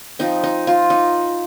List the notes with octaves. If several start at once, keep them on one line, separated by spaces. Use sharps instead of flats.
F3 C4 D#4
D#4
F4
D#4